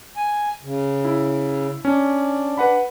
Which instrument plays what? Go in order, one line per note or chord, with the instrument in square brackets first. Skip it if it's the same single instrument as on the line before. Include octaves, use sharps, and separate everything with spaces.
[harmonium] G#5
C#3
[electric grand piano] E4
[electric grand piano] C#4 [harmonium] D4
[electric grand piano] B4 F#5 B5